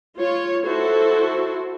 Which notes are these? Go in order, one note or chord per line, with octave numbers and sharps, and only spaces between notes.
F4 C#5
E4 F#4 A4 C5